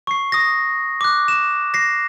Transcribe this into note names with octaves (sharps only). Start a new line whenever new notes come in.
C#6 C7
D#6 A#6
D6 F#6
E7
A#6 C7